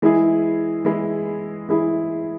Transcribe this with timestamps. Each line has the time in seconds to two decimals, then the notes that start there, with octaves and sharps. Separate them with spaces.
0.02 E3 G#3 E4 G#4
0.85 E3 G#3 E4 G#4
1.69 E3 G#3 E4 G#4